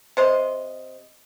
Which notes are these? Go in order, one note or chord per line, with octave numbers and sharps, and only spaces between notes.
C3 C5 D#5